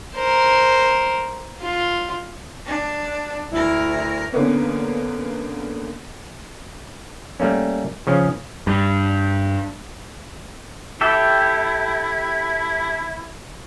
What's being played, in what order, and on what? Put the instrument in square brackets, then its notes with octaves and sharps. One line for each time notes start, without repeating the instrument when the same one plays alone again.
[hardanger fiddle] A#4 C5
F4
[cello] D4
[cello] D2 A#4 [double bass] E4
[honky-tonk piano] E2 D3 A#3 B3 C#4
[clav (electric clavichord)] G3 A3 A#3 C#4
C#3 F3 C#4
[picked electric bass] G2
[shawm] E4 [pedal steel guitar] G4 A4 E5